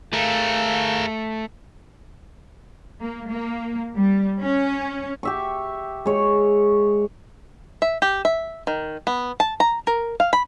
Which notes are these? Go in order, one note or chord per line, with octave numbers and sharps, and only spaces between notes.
A3 G#4 A#4 F5
A#3
A#3
G3
C#4
G4 E5 C#6
G#3 C#5
E5
G4
E5
D#3
B3
A5
A#5
A#4
F5
B5